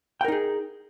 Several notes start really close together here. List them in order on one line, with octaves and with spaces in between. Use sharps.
G5 A#4 D#4 G#4